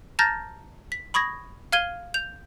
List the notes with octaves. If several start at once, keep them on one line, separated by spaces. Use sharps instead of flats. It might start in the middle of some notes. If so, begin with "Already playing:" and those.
A5 A#5 F6 G6 A6 A#6
B6
B5 C#6 D#6 G#6 A#6
F5 F6 G#6 D#7 G7
G6 F7